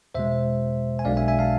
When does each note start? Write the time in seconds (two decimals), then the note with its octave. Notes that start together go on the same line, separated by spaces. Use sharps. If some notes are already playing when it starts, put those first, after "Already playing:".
0.15 E2 B2 G#3 C5 E5
0.99 G#5
1.05 B1 B2 G#3 D4 D5 F5
1.17 E5 G#5
1.28 E5 G#5
1.39 F5 A5